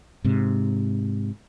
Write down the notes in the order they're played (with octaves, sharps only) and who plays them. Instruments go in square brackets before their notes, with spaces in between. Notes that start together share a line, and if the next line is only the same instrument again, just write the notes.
[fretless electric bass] G#2 C3